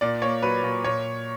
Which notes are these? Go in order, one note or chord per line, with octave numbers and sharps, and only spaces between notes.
A#2 D5
A#3 C#5
F#3 B4
A#2
A#2 C#5